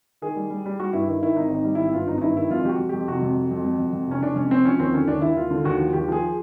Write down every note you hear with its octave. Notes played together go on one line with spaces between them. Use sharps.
D#3 G#4
G3
G3
G3
G3 F#4
G2 E4
D#3 E4
D#3 E4
G#1 D#4
G#1 D#4
G3
G#1 E4
E4
G2 F4
G#1 D#4
D#4
G2 E4
D#3 E4
F2 F4
F2 F#4 G4
F2
F2 G4
C3 F#4
F2
F2
F2
F2
F2
F2
C3 C#4
C3 D4
F2 C#4
F2 C4
F3 C#4
D#2 C4
D3 C#4
D#2 D4
D#2 E4
D#2 F4
D3
D#2 F#4
F3
D#2 G4
F3 G#4